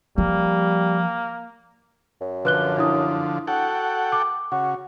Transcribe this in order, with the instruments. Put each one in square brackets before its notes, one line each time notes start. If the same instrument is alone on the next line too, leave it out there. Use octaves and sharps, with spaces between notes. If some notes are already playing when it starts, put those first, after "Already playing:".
[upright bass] F3 [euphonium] G3 [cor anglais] A#3
[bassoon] F#2
[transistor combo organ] D3 F3 [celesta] B4 F#6 G7
[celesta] D4 E4 D#6
[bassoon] F#4 [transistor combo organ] A4 F#5 G5
[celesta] D6
[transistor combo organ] C#3 [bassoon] F#4